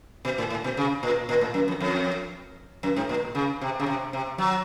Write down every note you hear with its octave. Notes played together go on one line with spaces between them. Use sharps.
B2
A2
A2
B2
C#3
A#2
A#2
A2
F#2
F2
F2
F#2
G#2
A#2
C#3
C3
C#3
C3
C3
F#3